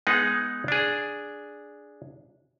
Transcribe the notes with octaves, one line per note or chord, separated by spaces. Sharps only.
G#3 B3 D#4 G#4 F#5
D4 G#4